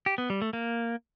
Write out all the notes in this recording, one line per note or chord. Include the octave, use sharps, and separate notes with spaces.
G4
B3
G3
A3
A#3